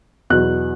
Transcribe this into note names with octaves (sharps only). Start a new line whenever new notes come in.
E2 B2 F#3 B3 F#6